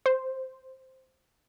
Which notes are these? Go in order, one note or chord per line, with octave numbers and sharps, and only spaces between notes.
C5